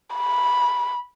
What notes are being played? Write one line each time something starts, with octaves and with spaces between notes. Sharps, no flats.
B5